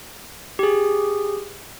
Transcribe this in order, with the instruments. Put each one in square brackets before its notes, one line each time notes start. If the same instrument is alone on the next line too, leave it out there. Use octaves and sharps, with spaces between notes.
[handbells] G4 G#4